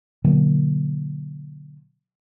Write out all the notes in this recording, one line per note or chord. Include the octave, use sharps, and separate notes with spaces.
B2 D3 F#3 A#3